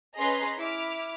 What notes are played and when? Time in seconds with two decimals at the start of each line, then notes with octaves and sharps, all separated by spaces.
0.17 C#4 G#4 B4 D#5 A#5 C6
0.58 E4 D6 F6